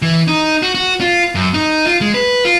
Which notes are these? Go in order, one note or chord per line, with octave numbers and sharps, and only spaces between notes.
E3
D#4
F#4
F#4
F4
F#2
D#4
F4
G#3
B4
F4